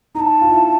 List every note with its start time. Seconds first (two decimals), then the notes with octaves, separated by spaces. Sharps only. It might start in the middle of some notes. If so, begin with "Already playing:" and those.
0.15 D#4 A#5
0.20 A5
0.41 F4
0.52 E4